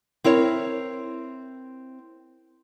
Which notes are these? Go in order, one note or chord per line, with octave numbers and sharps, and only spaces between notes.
C4 E4 A#4 C#5